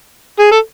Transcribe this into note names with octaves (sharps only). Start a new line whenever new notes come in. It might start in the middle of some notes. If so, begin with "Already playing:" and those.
G#4
A4